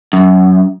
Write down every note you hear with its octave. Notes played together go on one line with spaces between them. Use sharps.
F#2